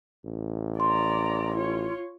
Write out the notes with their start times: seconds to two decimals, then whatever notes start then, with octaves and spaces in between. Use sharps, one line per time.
0.25 A1
0.80 D5 A#5 C6
1.56 F4 C#5